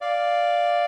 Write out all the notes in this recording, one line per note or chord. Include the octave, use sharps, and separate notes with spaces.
D5 F5